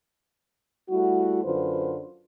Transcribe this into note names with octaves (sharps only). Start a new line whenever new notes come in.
G3 A3 E4 F#4
F#2 D3 F4 B4 C5